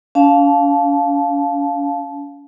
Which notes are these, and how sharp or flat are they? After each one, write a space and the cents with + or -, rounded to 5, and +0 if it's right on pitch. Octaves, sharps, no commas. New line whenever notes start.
C#4 +45 F5 +5 A5 -25